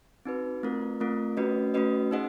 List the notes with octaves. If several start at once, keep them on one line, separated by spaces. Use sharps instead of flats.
C4 D#4 F#4 B4
A3 C4 F4 A#4
A3 C4 F4 A#4
A3 C#4 F#4 B4 D#5
A3 C#4 F#4 B4 D#5
D#4 G#4 C5 D#5 F#5